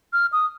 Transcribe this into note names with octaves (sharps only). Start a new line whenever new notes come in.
F6
D#6